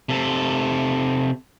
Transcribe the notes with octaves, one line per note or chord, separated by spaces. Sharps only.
C3 A4